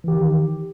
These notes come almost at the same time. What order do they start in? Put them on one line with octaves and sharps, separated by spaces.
E3 G4 D#3